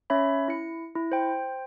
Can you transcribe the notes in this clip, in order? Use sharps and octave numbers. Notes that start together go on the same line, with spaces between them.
C#4 C#5 E5 B5
E4 C#7
E4
C5 G5